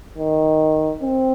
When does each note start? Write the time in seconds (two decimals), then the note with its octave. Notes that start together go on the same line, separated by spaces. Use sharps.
0.18 D#3
1.03 C4